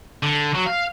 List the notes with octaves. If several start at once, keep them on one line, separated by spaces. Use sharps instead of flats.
D3
F#3
F5